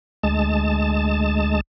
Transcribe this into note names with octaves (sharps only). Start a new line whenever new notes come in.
D2 G#3 A5